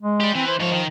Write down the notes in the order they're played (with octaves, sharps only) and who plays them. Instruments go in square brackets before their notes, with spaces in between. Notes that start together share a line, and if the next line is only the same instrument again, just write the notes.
[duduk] G#3
[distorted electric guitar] G4 D5
[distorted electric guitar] E3 [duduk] C4
[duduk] C5
[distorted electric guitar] G#2 C#5 [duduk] F3
[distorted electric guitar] D#3